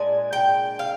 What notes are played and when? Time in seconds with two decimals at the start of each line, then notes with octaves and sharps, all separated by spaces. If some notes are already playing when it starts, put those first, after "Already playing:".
Already playing: A#2 G#3 D4 G#5
0.33 G5
0.79 F5